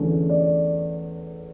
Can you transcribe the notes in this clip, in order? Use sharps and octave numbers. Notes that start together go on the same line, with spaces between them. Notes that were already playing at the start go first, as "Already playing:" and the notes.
Already playing: E2 D3 A3 C#4
D5